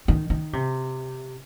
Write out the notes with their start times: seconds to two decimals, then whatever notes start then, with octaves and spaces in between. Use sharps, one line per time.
0.08 D#3
0.30 D#3
0.53 C3